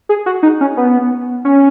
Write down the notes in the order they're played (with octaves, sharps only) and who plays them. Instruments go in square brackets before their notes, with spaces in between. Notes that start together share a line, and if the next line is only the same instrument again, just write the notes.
[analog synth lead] G#4
F#4
D#4
C#4
B3
C#4